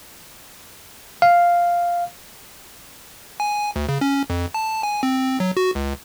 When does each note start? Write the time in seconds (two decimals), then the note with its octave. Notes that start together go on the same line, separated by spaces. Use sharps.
1.22 F5
3.40 G#5
3.76 D2
3.89 C#3
4.01 C#4
4.30 F2
4.54 A5
4.83 G#5
5.03 C4
5.40 F#3
5.57 F#4
5.75 C#2